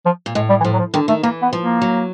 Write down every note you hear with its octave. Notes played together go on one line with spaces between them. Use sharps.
F3
A#2
A2 G#3
G3
E3
A2 F3
F#3
F3
D3 D#3
D#3 A3
E3 A#3
B3
F3
A#3
F#3